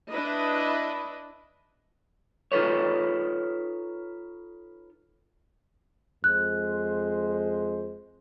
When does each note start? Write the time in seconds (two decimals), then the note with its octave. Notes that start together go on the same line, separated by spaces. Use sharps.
0.11 D4 E4 B4 D#5 B5
2.52 D#4 F4 A4 B4 C#5
6.24 F2 G#3 C5 F#6